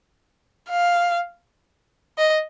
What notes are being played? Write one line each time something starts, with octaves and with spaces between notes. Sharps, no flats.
F5
D#5